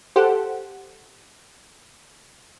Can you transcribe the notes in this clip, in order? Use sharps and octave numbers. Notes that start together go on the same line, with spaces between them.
G4 A4 C5 F#5